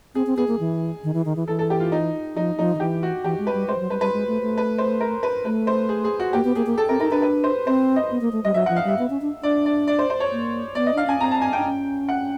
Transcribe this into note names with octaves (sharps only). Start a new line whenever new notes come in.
C4 G#4
C4
B3 G#4
A#3
E3
D#3
E3
D#3
E3
E3 A4
A4
G4
F4
D#4
F3 D#4
F3 D#4
D#3
E3 G4
F#4
E3 G4
G#3
B4
G3
G#3 C5
F3
F#3
G3 B4
G3 B4
G#3
A3
A3
B4
C5
A#4
B4
A3 B4
C5
G#4
G#4
F#4
A#3 G4
B3
A#3 G#4
A#3
A4
C4 A#4
D#4 A#4
D4 B4
B4
C5
C4 C5
D#5
B3
A#3
A3
G3 D#5
F#3 E5
F3 F#5
F5
G3 E5
B3
C#4
D4
D4 D5
D5
D5
C5
C5
C#5
A#3
B3 D5
D#5
D4 F5
C#4 G#5
C4 A#5
A5
G#5
D4 G5
C#4
F#5